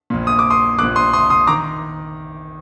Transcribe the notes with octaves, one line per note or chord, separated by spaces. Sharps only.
A#1 A#2
D#6
D6
C6 D#6
A#1 A#2 D6 F#6
C6 D#6
C6 D#6
C6 D#6
D#3 A#5 D6